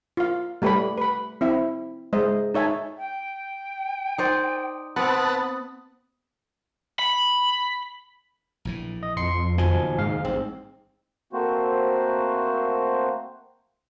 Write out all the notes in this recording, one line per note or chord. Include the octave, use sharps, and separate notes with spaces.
F4 F5
G3 A3 G4 B4 C#5 B5
B4 B5
C4 E4 E5
G#3 C5 D#5 E5
D#4 C#5 E5 G#5 A5
G5
D#4 C5 D5
B3 C4 B4 F#5 A5 D#6
B5
A#1 A2 E3
D#5
F2 C6 C7 C#7
F#1 D#2 B2 D#3 F3 G#5
G#2 F5
A1 C4
A3 A#3 C4 F#4 C5